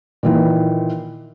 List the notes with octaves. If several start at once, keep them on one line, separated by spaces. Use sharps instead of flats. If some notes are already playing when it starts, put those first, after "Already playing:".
A#2 D#3 E3